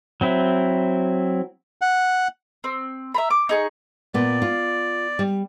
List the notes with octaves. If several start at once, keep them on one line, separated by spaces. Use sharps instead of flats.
F#3 C4 E4
F#5
C4
E5 A#5 B5
D6
D#4 G#4 C#6
A#2 B3 D5
F4
G3